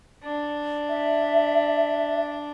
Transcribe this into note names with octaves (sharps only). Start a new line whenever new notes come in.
D4
E5